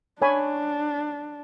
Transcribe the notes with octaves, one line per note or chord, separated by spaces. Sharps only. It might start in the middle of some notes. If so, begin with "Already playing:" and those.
D4 C#5 G#5 B5